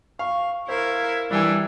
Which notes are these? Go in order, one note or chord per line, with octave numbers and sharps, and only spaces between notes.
F5 C#6
E4 A#4 C5 F5
E3 G3 D4 E4 G5 G#5 E6